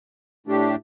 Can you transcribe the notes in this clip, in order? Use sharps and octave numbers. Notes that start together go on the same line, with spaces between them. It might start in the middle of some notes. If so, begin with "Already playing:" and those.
A2 A3 D4 G4